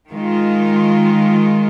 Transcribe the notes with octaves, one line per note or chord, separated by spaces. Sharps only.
D#3 G#3 F4